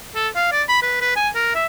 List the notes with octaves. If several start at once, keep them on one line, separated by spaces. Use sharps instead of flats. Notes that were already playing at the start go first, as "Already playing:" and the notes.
A4
F5
D5
B5
B4
B4
G#5
A#4
E5